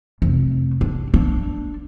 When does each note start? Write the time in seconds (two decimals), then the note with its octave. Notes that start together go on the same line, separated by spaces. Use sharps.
0.22 F1
0.81 D4
1.14 D4